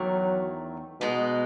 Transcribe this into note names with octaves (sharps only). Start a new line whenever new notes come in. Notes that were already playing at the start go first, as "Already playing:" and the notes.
Already playing: E2 D#3 F#3 A3
B2 G#3 B3 D#4